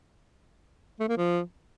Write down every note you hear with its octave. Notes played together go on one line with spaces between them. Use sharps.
A3
A#3
F3